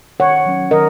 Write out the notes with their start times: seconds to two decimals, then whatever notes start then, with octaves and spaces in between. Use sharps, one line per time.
0.19 D#3 C#5 F#5
0.46 F#3 C#4
0.71 D#3 A#4 D#5